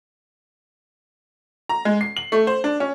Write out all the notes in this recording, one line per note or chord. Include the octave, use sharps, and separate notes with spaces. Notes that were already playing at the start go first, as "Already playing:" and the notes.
A#5
G#3
C7
F#7
A3
C5
D4
C#4